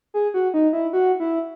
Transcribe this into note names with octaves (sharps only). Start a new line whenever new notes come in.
G#4
F#4
D#4
E4
F#4
E4